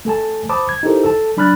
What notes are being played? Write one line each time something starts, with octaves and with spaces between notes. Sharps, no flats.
A3 A4 G#5 A5
C5 A5 B5 D6 D#6
G#6
D#4 E4 G4 A4 A#4 C5
A4 A5
F#3 D4 B5 F6 F#6 A6